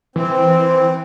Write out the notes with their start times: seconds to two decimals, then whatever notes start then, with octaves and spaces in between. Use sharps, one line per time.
0.16 E3 C4